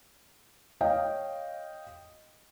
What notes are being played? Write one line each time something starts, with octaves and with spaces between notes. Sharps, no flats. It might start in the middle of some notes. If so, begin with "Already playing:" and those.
C#5 D#5 F5 G5